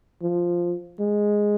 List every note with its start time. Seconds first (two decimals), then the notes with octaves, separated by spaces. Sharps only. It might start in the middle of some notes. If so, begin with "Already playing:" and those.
0.23 F3
1.00 G#3